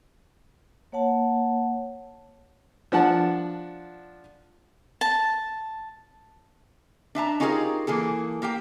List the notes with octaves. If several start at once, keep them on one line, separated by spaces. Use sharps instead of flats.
A#3 C#5 F#5 A5
F3 D4 F#5 A5
A5
D4 E5 A5 A#5
C#4 D#4 F4 G4 G#4 A#4
E3 A#3 G#4 A4
A#3 G4 F5 G5